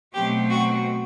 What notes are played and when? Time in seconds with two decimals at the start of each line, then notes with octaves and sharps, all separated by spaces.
0.14 B2 F#3 A3 C4 G4
0.50 F#4